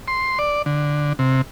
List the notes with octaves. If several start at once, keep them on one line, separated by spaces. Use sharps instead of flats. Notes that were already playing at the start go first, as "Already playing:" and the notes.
C6
D5
D3
C3